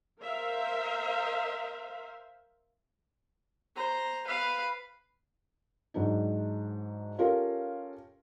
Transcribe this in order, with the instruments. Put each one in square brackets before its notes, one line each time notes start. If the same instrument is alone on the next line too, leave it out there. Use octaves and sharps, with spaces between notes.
[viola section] A#4 C5 E5 F5
[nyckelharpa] C5 A#5
B4 F5
[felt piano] G#2 F#3 D4 D#4
C#4 F4 G4 A4 A#4 F5